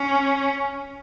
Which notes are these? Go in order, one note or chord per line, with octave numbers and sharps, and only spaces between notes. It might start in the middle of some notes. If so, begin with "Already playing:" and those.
Already playing: C#4